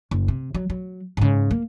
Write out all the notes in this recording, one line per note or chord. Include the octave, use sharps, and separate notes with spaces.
F#1
C3
F#3
F#3
G#2 C#3
A#3